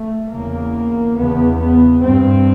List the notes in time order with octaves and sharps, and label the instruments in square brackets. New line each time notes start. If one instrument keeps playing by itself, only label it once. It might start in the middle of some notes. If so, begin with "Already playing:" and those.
Already playing: [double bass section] A3
E2 C#3 A#3
E2 C#3 B3
B3
G2 C4